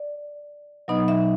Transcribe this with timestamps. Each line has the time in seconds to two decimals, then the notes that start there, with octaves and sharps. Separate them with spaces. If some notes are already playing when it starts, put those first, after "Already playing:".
Already playing: D5
0.88 B2 F#3 B3 D#4 D#5
1.08 E5